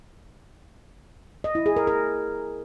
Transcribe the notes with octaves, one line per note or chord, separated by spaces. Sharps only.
D#5
E4
G#4
A#4
A#4